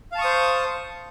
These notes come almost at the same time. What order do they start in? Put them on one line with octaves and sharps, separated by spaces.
F5 A5 C#6 D#6 C5